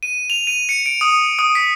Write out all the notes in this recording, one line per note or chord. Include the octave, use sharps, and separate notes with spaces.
D#7
F7
D#7
C#7
D7
D#6
D#6
B6